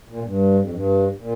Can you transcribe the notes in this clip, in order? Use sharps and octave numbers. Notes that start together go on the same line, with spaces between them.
A#2
G2
F2
G2
A#2